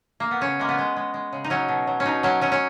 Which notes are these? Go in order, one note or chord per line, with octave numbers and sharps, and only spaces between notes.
A#3
B3
C#3 C#4
G#3 A#3
B3
G#3
G#3
G#3
C#3
D#4
F#3 C#4
B2
F#3
C#4
B2 D#4
F#3 C#4
F#3 C#4
C#4